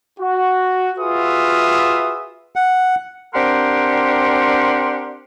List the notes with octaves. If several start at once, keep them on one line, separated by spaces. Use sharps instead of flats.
F#4
F4 F#4 G#4 B4 E5 D#6
F#5
C4 D4 G4 A#4 F#5 C6